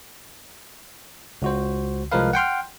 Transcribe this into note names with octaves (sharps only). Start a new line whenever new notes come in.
C#2 F#4 C5
C2 F3 G#3 A#4 B4 F5
F#5 G5 C6 F6